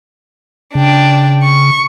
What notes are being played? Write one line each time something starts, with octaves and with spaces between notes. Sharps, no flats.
C#3 D4 G5
C#6